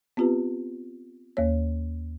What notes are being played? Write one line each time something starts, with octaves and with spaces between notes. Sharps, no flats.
B3 C4 F4 G4 B4
D#2 A#3 C#5